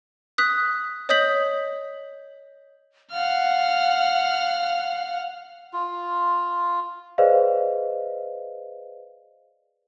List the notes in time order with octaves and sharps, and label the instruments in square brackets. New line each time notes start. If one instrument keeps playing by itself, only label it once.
[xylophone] D#6 F#6 B6
C#5 D#5 D#6 G6 B6 F#7
[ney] F5 [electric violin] F#5 F6
[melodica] F4
[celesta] G#4 B4 C5 D5 D#5 F5